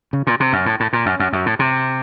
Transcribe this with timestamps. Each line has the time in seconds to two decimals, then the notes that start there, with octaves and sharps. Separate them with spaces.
0.13 C#3
0.27 A#2
0.40 C3
0.53 F#2
0.66 A2
0.80 A2
0.93 A#2
1.06 F#2
1.20 F#2
1.33 F#2
1.46 A2
1.59 C3